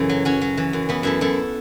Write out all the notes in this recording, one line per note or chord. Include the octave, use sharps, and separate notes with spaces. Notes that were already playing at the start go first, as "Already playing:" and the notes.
Already playing: F#2 C#3 E3 E4 A4
F#3
F#3 C#4 F#4
F#3
E3
F#2
E3 B3 E4
F#2 E4 A4
F#2 E4 A4